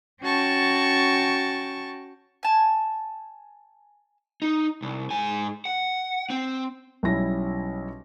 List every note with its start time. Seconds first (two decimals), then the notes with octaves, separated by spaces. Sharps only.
0.23 C#4 F#4 G5 A5 C#6 A6
2.43 G#5 A5
4.42 D#4
4.82 C2
5.10 G#2 G#5
5.65 F#5
6.30 C4
7.03 B1 G3 C#4 E4 A#6